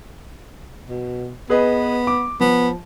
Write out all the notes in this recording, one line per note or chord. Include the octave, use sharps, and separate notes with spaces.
B2
B3 G#4 B4 D#5
D6
F3 B3